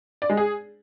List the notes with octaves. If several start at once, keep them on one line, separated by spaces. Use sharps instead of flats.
D5
G#3
G#4